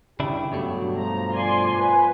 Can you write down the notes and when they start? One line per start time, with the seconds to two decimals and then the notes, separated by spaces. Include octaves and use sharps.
0.20 G2 C#3 D4 E4 G4
0.52 G2 B2 F#3 G3 A3
0.97 F3 A#5
1.34 F3 D5 G#5 C6
1.79 B4 G#5